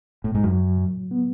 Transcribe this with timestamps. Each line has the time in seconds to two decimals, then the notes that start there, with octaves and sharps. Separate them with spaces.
0.24 A2
0.35 G#2
0.44 F#2 F#3
0.77 A2
1.11 B3